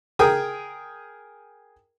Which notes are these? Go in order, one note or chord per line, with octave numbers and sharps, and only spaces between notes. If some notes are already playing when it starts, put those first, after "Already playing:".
G#4 A#4 G5 G#5 D#6